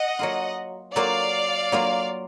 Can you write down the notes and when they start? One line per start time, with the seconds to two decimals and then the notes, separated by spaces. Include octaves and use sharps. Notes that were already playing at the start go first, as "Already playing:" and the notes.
Already playing: D#5 F#5
0.19 F#3 A#3 F4
0.95 F#3 A#3 F4 D5 F5
1.72 F#3 A#3 F4